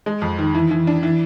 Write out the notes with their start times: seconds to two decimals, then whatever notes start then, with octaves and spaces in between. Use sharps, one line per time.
0.06 G#3
0.22 F2
0.39 D#3
0.55 E3
0.71 E3
0.87 D4
1.03 E3